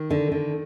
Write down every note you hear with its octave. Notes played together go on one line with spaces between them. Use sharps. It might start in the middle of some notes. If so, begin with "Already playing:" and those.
Already playing: D#3
D3
D3